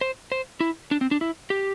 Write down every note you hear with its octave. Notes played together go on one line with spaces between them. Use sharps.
C5
C5
E4
D4
C4
D4
E4
G4